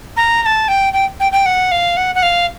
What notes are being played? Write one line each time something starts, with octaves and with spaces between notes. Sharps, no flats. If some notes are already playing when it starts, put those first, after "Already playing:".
A#5
A#5
A5
G5
G5
G5
G5
F#5
F5
F#5
F#5
F5